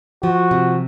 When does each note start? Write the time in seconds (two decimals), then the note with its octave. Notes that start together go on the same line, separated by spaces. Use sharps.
0.23 F3 F#4
0.51 C3